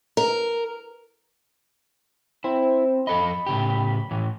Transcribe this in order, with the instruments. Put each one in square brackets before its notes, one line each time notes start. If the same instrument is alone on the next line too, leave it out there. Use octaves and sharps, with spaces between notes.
[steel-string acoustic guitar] A#4
[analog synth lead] C4 [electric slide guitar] E4
[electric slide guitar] F2 A4 D#5 [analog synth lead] B5
[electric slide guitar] A2 C#3 G4
A2 E3